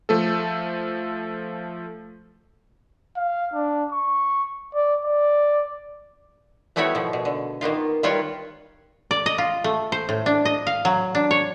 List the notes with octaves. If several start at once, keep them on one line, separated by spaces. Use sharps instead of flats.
F3 A3 A4
F5
D4
C#6
D5
D5
G3 A3 B3 E4 F#4 C#5
B2 F3
B2
D3
D#3 A#3 B3 F4
D#3 G3 F4 A#4 B4 C#5
D5
D#5
F4
A3
C5
A2
D4
D#5
F5
F#3
D4
C#5